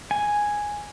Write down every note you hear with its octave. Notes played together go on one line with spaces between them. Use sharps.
G#5